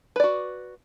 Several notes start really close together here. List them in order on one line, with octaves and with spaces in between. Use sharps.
B4 D5 F#4